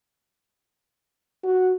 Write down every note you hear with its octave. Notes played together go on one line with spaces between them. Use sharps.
F#4